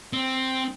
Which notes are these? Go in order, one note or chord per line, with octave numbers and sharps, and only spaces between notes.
C4